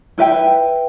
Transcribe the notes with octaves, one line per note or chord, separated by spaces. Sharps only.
E4 B4 E5 G5